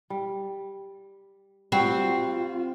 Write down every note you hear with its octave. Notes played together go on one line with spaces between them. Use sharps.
G3
G3 C4 F4 F#4